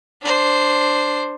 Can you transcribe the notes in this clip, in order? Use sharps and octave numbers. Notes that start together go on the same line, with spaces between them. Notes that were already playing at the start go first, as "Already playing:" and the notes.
D4 C5